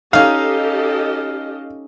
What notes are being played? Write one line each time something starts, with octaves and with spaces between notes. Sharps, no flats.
C#4 D#4 G4 A4 D#5 F5